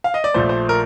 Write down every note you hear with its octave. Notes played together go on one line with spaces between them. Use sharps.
F5
D#5
D5
A#1 A#2 F3 A3 C5
C5
A#4